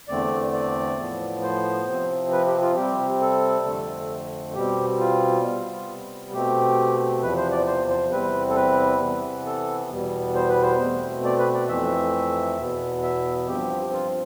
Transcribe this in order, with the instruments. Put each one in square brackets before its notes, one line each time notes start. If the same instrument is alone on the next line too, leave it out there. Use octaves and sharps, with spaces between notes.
[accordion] E2 D3 A3 C4 D5
D5
A2 F3 B3
C5
C3 F3 C4
B4
G4
F4
C3 G3 C4 G4
A4
F2 D3 A3 C4
B2 G3 C4 G4
F4
C3 G3 B3
B2 A3 C4 G4
E2 C3 F3 B4
C5
D5
C5
C5
E2 C3 G3 C4 B4
A4
B4
C3 E3 B3
A4
E2 B2 G3 B3
C5
B4
C5
B2 A3 C4
D5
B4
D5
F2 E3 A3 C4 E5
E2 B2 B3
E5
G2 F3 C4 G4
F4